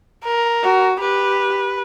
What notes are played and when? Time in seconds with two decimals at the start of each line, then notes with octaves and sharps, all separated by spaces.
0.24 A#4
0.63 F#4
1.00 G4 B4